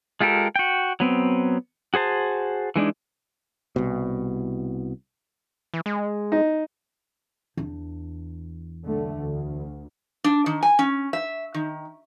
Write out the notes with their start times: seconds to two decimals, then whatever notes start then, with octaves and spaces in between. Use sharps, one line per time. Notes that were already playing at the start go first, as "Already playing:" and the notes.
0.21 G#3 F4 G4 A4 A#4
0.56 F#4 G5
1.00 F#3 B3 C4
1.94 F#4 G#4 C5 A5
2.76 E3 G#3 D4 D#4
3.76 C2 B2
5.74 E3
5.86 G#3
6.32 D#4
7.57 E2 D4
8.83 B1 D3 A3
9.15 D2
10.24 D4
10.46 D#3
10.63 G#5
10.79 C#4
11.13 E5
11.54 D#3